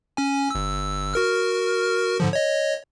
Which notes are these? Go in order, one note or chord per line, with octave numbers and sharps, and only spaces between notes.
C#4 G#5
G1 E6
F#4 A#4 F6
G#2 D3 F3
C#5 D#5